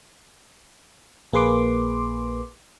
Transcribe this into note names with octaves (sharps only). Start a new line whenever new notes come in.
A#1 A#3 G#4 B4 C6 D6